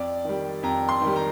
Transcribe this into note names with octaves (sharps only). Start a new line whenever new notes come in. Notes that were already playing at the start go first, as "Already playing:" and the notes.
Already playing: F2 D5
D#3 G3
F2 A#5
C6
D#3
G3
A#5